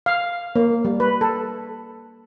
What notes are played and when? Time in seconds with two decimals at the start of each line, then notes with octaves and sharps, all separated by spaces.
0.06 F5
0.56 A#3
0.85 G3
1.00 B4
1.21 A4